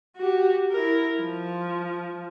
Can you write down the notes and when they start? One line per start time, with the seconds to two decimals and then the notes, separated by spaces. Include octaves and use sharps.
0.17 F#4 G4
0.71 E4 A#4
1.21 F3